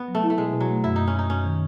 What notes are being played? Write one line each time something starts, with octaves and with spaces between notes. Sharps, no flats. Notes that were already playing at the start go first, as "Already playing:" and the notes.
Already playing: B3
F#3
A3
E4
A3
B2 G#3
B2
F#3
A3
F#2 E4
F#2 D#4
C#4
F#2 D#4
F#2 C#4
D#3